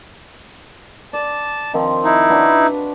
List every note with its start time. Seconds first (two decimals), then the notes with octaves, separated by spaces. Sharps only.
1.13 D5 A5
1.73 D#3 F3 C4
2.04 D#4 E4 F5
2.30 D4 F#4 B4